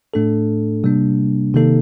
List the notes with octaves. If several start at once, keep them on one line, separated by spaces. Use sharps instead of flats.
A2 A3 D4 A4
C3 G3 A#3 D4
C3 D#3 A#3 D#4 A4